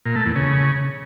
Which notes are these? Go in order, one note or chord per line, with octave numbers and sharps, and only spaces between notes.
A#2
A3
E2
C#3